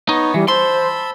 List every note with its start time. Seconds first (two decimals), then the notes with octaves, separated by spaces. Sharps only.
0.09 B3 D#4 C#5
0.34 E3 G3
0.48 C5 A5 B5 C6 E6